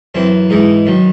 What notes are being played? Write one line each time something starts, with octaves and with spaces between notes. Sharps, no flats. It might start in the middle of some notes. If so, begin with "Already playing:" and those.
F#2 E3 C4
G#2 E3 D#4
F#2 D#3